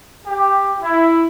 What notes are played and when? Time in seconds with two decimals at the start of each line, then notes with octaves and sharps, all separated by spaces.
0.24 G4
0.81 E4